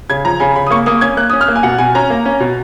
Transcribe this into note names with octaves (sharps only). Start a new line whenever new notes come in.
C#3 G#6
F3 A#5
C#3 G#5
C#3 B5
D#6
A#3 C#6
A#3 D#6
C#4 G#6
A#3 F#6
C#4 D#6
F6
A#3
G#5
B2 F#5
B2 G#5
C#4 A#5
A#3
C#4
B2